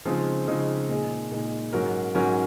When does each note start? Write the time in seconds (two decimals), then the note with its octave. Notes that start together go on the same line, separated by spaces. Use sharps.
0.05 C#3 F3 G#3 C4 D#4
0.47 C#3 F3 G#3 C4 D#4
0.89 A#2 G#3 D#4 G#4
1.31 A#2 G#3 D#4 G#4
1.73 G#2 F#3 C#4 F#4 A#4
2.15 G#2 F#3 C#4 F#4 A#4